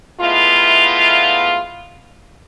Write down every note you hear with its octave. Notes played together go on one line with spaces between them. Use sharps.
G#3 A3 B3 E4 F4